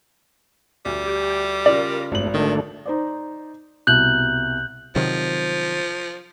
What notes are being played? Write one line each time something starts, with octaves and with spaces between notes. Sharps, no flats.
D2 G3
G4
C#3 F4 A#4 D5
G#1 G2 A3 F#7
D3 D#3 A3 D4
D#4 C5 D5
C2 B2 F#6 G6 F#7
C3 D#3 F3 F#3